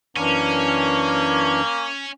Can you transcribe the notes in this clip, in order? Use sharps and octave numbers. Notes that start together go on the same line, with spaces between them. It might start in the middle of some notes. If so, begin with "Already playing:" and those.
F#2 E3 A#3 C#4 D4